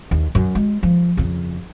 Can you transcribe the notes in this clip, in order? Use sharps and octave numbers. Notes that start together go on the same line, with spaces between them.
D#2
F#2
G#3
F3
F2 C#3